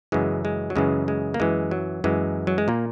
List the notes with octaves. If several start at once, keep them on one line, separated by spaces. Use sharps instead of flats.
F#2 C#3 E3 G#3
G#3
F#3
F#2 C#3 E3 G#3
G#3
A#3
F#2 E3 G#3
F#3
F#2 E3 G#3
F#3
G#3
A#2 A#3